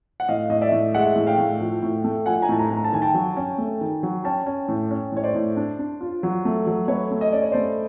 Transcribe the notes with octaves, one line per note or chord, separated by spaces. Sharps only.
F#5
A2 D#5 F5
A2 D#5
D5 E5
A2
G#3 E5 F#5
A2
F5 G5
A2
F3
A2
A3
F3 F#5 G#5
G#5 A#5
A2 A5
G#5 A#5
A2
A#5
A5
D#3 G#5
G5 A5
F#3
C#4
A3
D#3
F#3
C#4 G5 A5
C#4
A2
C#4
A2 C#5
C5 D5
A2
D4
D4
F4
F#3
A3
F#3
A3 B4 C#5
A3
D#5
C#4 D5
C#5
A3 C5 D5